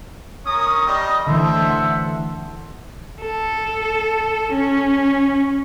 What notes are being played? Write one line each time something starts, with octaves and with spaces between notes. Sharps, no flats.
C#4 A#4 D#6
G3 D#5
D3 E3 A3 A4 C5 E5
F#5
A4
C#4